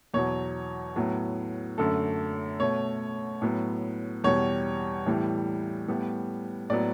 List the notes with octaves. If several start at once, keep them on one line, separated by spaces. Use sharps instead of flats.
E2 B2 F#3 C#5
A2 F#3 B3
F#2 D3 A3 A4
B2 A3 C#5
A2 F#3 B3
E2 B2 G3 C#5
A2 E3 G3 B3
A2 G3 B3
A2 F#3 B3 D5